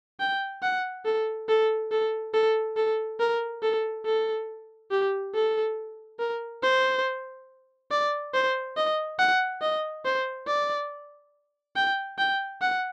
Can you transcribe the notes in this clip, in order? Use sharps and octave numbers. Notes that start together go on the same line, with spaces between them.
G5
F#5
A4
A4
A4
A4
A4
A#4
A4
A4
G4
A4
A#4
C5
D5
C5
D#5
F#5
D#5
C5
D5
G5
G5
F#5